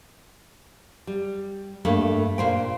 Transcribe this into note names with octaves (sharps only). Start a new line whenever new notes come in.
G3
G2 A3 A#3
A#2 C5 G5